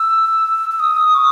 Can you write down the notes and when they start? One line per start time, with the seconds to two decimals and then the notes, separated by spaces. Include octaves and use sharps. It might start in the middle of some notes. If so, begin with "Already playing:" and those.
Already playing: E6
0.71 E6
0.80 D#6
1.15 C#6